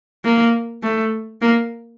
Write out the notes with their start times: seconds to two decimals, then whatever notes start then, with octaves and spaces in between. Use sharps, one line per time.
0.25 A#3
0.83 A3
1.42 A#3